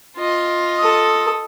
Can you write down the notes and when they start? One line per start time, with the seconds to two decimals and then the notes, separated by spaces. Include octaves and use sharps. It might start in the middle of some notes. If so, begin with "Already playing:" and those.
0.17 F4 D#5
0.79 A4 D#6